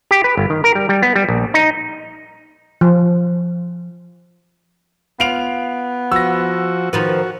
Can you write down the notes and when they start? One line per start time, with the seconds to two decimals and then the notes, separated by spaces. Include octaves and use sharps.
0.11 G4
0.24 B4
0.37 G1
0.50 D#3
0.64 A#4
0.75 G3
0.89 G3
1.02 B3
1.16 G3
1.28 A#1
1.54 D#4
2.81 F3
5.20 B3 F4 C7 D7 F7
6.12 F3 F#4 E6 A#6
6.93 D#3 F3 F#4 B4